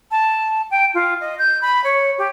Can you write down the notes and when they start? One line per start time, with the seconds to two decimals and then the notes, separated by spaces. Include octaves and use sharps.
0.11 A5
0.70 G5
0.94 F4
1.20 D#5
1.38 G6
1.61 B5
1.83 C#5
2.18 G4